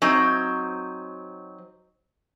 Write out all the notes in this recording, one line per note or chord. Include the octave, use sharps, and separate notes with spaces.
F#3 C4 D#4